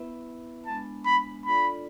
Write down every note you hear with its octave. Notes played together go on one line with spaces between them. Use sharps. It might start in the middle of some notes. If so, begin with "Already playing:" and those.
Already playing: B3 E4 B4 E5
G#3 B3 D4 A5
B5
D4 F4 A4 D5 B5